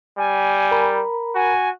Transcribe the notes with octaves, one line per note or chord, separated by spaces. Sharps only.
G3 G#5
A#4 A#5 B5
F#4 G#5